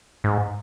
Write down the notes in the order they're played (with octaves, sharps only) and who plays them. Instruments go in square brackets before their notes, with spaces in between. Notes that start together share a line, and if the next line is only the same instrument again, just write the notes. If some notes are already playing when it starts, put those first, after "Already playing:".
[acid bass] G#2